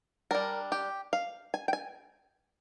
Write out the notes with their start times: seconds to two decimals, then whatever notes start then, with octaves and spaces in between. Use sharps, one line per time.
0.31 G3 D4 A#4
0.72 G4
1.13 F5
1.54 G#5
1.68 G5
1.73 G#5